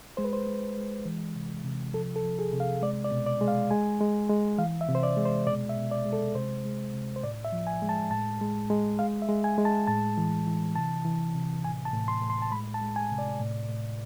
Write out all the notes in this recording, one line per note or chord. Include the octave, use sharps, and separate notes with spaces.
G#3 C5
B4
C5
G#3
G#3
E3
C3
C3
F3 A4
A4
F3
G#4
C3
F5
G#3 D5
D5
B2
D5
G#3
F5
G#3 G#5
G#3
G#3
E3 F5
E5
C3
C5
D5
G#3
C5
B2 D5
E5
B2
D5
G#3
A4
C3 C5
G#3
C3
C5
A2 D5
E5
F3
G#5
G#3
A5
A2 A5
G#3
G#3
G#3 F5
E5
G#3
G#5
G#3
A5
A2 A5
E3
E3
C3 A5
E3
C3
A2 G#5
A5
A2
C6
A2
C6
A5
G#3 B5
A5
G#3
G#5
C3
D5
A2
A2